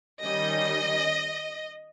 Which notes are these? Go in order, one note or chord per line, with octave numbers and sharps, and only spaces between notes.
D#3 G3 C#4 D#5